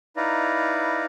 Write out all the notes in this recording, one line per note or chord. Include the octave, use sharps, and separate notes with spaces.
D#4 E4 B4 D5 F5 A#5